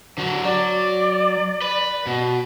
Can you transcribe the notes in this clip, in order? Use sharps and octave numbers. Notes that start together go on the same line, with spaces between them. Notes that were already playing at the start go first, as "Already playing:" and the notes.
D3 F#3
F#3 D5
B4
B2